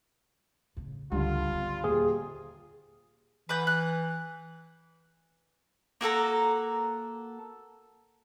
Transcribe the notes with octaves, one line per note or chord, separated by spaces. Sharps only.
A2 C#3
C#2 G2 D3 F4
B3 C4
D#1 G#4
E3 B4 F#5 G6
F#6
A#3 F#4 A4 A#5